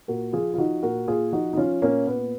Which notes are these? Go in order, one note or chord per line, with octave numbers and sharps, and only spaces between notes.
A#2 F#4 A#4
F3 F4 G#4
F4
F3 D#4 F#4
A#2 F#4 A#4
A#2 F4 G#4
F3 D#4 F#4
D#4
F3 C#4 F4
A#2 A#3 C#4
A#2 B3